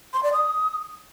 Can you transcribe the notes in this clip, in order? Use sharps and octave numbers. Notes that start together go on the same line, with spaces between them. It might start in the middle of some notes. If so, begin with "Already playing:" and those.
C6
D5
D#6